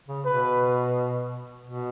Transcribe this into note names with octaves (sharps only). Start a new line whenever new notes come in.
C#3
B2 B4
B2